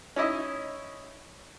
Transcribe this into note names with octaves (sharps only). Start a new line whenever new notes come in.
C#4 D#4 E4 D#5